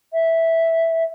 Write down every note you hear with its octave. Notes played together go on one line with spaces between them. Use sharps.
E5